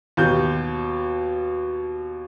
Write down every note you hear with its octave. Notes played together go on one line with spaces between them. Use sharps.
D#2 B2 G6